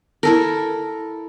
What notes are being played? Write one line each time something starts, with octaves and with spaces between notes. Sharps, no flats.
E4 A4 A#4